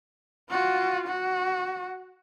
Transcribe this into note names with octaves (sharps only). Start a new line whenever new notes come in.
F4 F#4
F#4